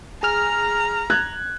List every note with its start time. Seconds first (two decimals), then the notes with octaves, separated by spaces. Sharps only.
0.23 G#4 A#5 F6
1.10 F#6 G#6